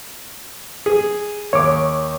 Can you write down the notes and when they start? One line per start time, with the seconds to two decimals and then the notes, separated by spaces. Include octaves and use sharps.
0.86 G#4
1.53 D#2 C#5 D6